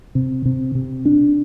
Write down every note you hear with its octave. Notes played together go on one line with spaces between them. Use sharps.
C3
C3
C3
D4